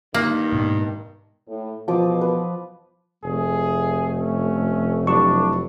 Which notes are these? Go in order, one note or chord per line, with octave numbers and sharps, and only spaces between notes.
G2 D#3 A#3
G#2 B2
A2
E2 B2 F3 D6 D#6
B4
F1 A3 G#4
C#4
F#3 D4 E4 G4 C#6